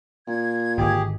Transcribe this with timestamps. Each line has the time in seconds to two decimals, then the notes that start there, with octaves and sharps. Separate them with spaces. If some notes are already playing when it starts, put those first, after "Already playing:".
0.27 A#2 G#6
0.77 G#1 D3 G4 G#4